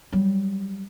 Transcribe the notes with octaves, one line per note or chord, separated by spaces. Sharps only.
F#3 G3